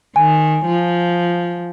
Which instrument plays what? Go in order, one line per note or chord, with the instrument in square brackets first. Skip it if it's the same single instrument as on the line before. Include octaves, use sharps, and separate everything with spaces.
[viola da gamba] D#3 [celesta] G#5
[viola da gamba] F3